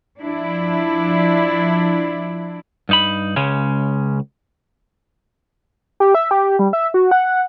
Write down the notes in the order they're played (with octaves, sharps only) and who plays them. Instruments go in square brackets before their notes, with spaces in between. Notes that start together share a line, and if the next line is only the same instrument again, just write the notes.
[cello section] F3 D4 E4
[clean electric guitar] G2 D#4 B5
C#2 C#3 G#3 C#4
[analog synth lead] G4
E5
G4
G3
E5
F#4
F#5